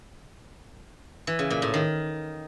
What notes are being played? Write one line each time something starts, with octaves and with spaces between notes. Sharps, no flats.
E3
C#3
A#2
A2
D#3